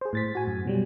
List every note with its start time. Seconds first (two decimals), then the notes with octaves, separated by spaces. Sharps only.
0.01 G#4 C5
0.13 A2 A6 B6
0.35 F#4 G#5
0.47 F#2
0.65 B2 F#3 G3